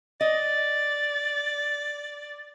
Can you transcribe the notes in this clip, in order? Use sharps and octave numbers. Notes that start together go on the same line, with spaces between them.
D5 D#5